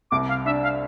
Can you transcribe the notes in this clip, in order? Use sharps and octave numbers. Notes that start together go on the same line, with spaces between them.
C2 D6
F5
D4 E5
F5